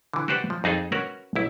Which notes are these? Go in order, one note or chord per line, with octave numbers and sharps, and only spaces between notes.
D3 E3
F#4 G4 B4 C5 D5 F#5
F3
F2 D#4 G#4 A4
C#4 F#4 A#4 B4
B1 E4